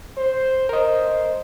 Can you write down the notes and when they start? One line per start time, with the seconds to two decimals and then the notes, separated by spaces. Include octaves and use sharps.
0.17 C5
0.69 A#4 C5 D#5